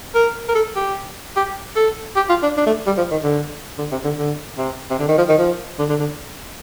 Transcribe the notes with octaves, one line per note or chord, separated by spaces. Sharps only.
A#4
A#4
A4
G4
G4
A4
G4
F4
D4
D4
A3
G3
F3
D#3
D3
D3
C3
D3
D3
C3
C3
D3
D#3
F3
D#3
F3
D3
D3
D3